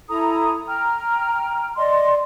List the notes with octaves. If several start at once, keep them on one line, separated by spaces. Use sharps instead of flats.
E4 A4 A#5 D#6
G5 A#5 F6
D5 D#5 C6